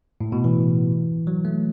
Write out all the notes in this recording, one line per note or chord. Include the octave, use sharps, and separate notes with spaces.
A2
B2
E3
F#3
A3